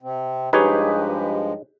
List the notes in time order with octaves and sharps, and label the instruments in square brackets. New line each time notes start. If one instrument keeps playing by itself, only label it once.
[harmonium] C3 C4
[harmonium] G2 F3 G#3 [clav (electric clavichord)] D#4 G#4 C#5 [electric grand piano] G4 B4